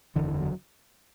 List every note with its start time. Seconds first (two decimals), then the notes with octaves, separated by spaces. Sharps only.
0.16 F#1 E2 D3 E3
0.27 E3
0.40 F#3